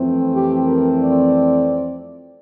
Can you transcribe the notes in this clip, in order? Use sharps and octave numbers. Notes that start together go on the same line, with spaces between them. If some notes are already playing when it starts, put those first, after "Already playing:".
Already playing: F2 E3 A3 C4
G4
A#4
D5